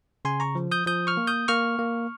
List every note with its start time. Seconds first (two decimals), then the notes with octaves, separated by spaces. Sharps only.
0.25 C#3 G#5 C6
0.40 A#5 C#6
0.55 F3
0.72 D#6 G6
0.86 F3 D#6 G6
1.07 C#6 F6
1.17 A#3
1.27 D#6 G6
1.48 A#3 C#6 F6
1.79 A#3